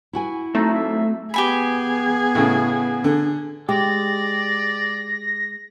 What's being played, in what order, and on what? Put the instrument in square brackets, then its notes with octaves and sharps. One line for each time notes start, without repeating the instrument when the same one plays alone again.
[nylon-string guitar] E4 F#4 G#5
[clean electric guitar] F#3 C4 [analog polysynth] A3 [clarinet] D#4
[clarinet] E5
[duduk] B3 [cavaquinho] G4 G#5 B5 [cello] G#4
[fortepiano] A2 C#3
D3
[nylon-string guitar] G#3 [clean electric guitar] G4 [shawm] D5 [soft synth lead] A#6